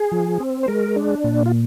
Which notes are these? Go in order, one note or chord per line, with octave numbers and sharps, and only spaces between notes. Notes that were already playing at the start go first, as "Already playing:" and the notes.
Already playing: G#4
F3
C4
C5
G#3 A#4
D4
A#2
F4